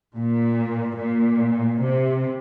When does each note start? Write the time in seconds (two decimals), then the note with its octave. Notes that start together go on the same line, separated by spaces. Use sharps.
0.15 A#2
0.99 A#2
1.82 C3